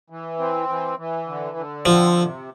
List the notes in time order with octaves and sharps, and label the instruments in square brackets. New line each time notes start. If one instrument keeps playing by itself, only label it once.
[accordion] E3
C4
E3
E3
D3
D3
[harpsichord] F3 [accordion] C4
[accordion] C3